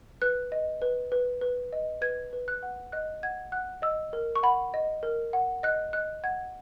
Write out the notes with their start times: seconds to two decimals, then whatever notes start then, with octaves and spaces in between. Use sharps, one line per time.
0.22 B4 F#6
0.52 D#5
0.82 B4
1.12 B4
1.41 B4
1.73 D#5
2.01 B4 G#6
2.33 B4
2.48 F#6
2.63 F#5
2.92 D#5 F#6
3.23 F#5 G#6
3.52 F#5 F#6
3.82 D#5 E6
4.13 A#4
4.36 C#6
4.43 F#5 B5
4.74 D#5
5.03 A#4
5.33 F#5
5.63 D#5 F#6
5.93 D#5 F#6
6.24 F#5 G#6